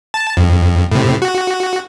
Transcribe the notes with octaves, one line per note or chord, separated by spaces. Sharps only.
A5
F2
A2 C3
F#4